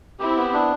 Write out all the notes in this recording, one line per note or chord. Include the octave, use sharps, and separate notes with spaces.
C4 E4 G4
B3
D4